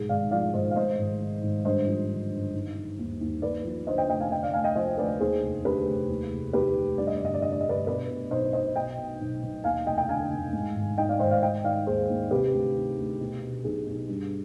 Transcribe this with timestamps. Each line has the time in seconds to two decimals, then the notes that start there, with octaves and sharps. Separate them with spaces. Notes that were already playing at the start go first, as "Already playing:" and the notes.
Already playing: B1 G#2 G#4
0.09 G#1 D5 F5
0.31 F3 D5 F5
0.53 G#1 C5 D#5
0.71 F5
0.76 G#2 C5 D#5
0.98 G#1
1.20 D#3
1.43 G#1
1.65 G2 C5 D#5
1.87 F3
2.09 D3
2.32 G1
2.54 D#3
2.76 D#3
2.99 D#2
3.21 D#2
3.42 D#2 B4 D5
3.64 F3
3.87 D3 C5 D#5
3.98 D#5 G5
4.09 F1 D#5 G5
4.20 F5 G#5
4.31 D3 D#5 G5
4.43 D5 F5
4.53 D2 F5 G#5
4.64 D#5 G5
4.76 F3 C5 D#5
4.98 D2 B4 D5
5.20 D#2 G#4 C5
5.42 F1
5.64 D3 G4 B4
5.87 F1
6.09 D#2
6.32 F1
6.53 D#3 G4 B4
6.76 F1
6.98 G2 D5
7.07 D#5
7.16 D5
7.20 G1 D#5
7.34 D5
7.42 D3 D#5
7.52 D5
7.60 D#5
7.65 G1 B4 D5
7.87 B2 B4 D5
8.09 B2
8.31 B1 C5 D#5
8.53 B1 C5 D#5
8.75 B2 D#5 G5
8.98 B2
9.21 B1
9.43 B1
9.64 D#2 F5 G#5
9.86 F1 D#5 G5
9.97 D#5 G5
10.09 D3 F5 G#5
10.31 F1
10.53 G#2
10.76 G#1
10.98 D#3 D#5 G5
11.09 D5 F5
11.19 G#1 C5 D#5
11.31 D5 F5
11.42 D#3 D#5 G5
11.64 D#3 D5 F5
11.86 D#2 G#4 C5
12.09 D#2
12.31 C3 G4 B4
12.53 D2
12.75 D#3
12.98 D2
13.20 B2
13.42 B2
13.64 B1 G#4
13.86 B1
14.09 G2